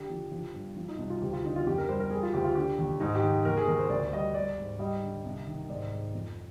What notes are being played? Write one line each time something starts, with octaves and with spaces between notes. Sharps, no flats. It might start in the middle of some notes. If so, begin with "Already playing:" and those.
Already playing: D3 G4
F3
F3
G2
F3
D#4
C2
F4
D2 G4
F4
D3 D#4
F4
F2 G4
A#4
G3 C5
A#4
G3 G#4
F4
D2 G4
F4
D3 G4
D#2
G#2 D#4
G4
D#3
D#2 A#4
G#4
D#2 A#4
C5
D2 D5
G3 D#5
G3 D5
G#2
G3 D#5
D3
C2
D#3
G#2 D5
G#2
F2